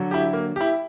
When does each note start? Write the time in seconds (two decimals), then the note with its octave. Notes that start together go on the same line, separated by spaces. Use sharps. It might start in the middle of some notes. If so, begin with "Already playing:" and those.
Already playing: D3 F#3
0.11 E4 G4
0.33 A#3
0.56 E4 G4